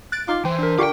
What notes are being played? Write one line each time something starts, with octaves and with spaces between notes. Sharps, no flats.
F#6 A6 D7
D#4 F4 D6
E3 C5 G5
D4 A#4
D3 F4 G4 F5 G5 C#6 D6